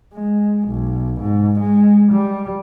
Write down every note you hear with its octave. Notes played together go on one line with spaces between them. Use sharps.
G#3
B1
G#2
G#3
G3